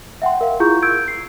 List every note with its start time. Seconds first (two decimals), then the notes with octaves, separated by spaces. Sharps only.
0.22 E5 F#5 G5 C6
0.41 A#4 F5
0.60 E4 F4 G#4 A#5 C#6 G6
0.82 E6 G6 G#6 D7
1.08 C7